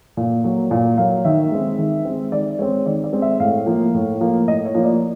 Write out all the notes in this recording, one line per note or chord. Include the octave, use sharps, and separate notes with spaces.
A#2
F#3 A#3
A#2
F#3 A#3 F5
D#3 E5
G#3 C4
D#3
G#3 C4
D#3 D5
G#3 C4 C#5
D#3 D5
D5
G#3 C4
E5
A2 F5
F3 A#3
A2
F3 A#3
A2 D#5
C#5
F3 A#3
D5